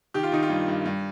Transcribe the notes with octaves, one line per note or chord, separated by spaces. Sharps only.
D#3 G4
F4
D#3 D#4
F4
G2
G2
G2